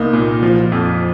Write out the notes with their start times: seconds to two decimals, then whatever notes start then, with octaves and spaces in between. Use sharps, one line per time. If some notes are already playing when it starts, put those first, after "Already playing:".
Already playing: C2 A#3 D#4
0.13 A#2
0.43 F3
0.72 F2